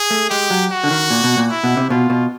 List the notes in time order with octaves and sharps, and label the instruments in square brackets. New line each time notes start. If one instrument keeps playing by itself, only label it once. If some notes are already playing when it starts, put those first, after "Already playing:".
Already playing: [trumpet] G#4
[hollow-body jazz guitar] A3
[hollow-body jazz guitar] G#3 [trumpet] G4
[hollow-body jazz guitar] F#3
[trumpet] F#4
[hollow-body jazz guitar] D3
D#3
A#2
B2
A#2
[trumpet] E4
[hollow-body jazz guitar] B2
C3
[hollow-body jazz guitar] B2 [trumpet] F4
[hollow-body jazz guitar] B2